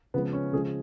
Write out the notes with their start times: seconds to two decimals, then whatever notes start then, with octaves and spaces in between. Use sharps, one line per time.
0.14 C#3 F3 G#3 B3
0.33 C#4
0.53 C#3 F3 G#3 G#4